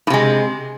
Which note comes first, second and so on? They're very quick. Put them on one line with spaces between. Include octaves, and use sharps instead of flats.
A2 C3 G#3